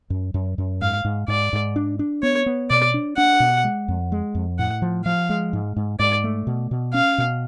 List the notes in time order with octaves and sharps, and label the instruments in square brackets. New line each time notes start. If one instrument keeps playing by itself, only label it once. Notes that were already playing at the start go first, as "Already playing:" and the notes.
[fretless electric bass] F#2
F#2
F#2
[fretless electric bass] G#2 [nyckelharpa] F5
[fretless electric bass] G#2
[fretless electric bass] G#2 [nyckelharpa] D5
[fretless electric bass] G#2
D4
D4
[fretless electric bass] B3 [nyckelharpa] C#5
[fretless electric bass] B3
[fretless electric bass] B2 [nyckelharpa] D5
[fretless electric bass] D4
[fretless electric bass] D4 [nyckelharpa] F#5
[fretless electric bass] B2
G#3
F2
G#3
F2
[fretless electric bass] A2 [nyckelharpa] F#5
[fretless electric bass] F3
[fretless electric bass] F3 [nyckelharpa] F5
[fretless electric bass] G#3
G#2
G#2
[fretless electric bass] G#2 [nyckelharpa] D5
[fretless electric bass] A3
B2
B2
[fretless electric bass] C#4 [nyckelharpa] F5
[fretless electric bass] B2